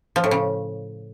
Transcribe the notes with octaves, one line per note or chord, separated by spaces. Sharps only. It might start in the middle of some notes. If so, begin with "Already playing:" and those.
F3
A2
C#3